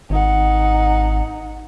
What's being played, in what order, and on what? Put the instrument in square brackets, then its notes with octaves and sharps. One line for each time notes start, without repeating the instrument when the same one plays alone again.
[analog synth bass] G#1 [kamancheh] D#4 F#5